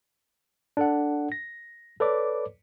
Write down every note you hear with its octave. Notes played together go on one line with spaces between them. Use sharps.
D4 A4 F#5
A#6
A4 B4 C#5 D5 D6